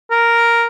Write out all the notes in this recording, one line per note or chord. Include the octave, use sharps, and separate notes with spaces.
A#4